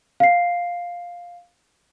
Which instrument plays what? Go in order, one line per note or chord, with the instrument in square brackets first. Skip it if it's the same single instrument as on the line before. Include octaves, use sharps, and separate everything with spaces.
[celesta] F5 C7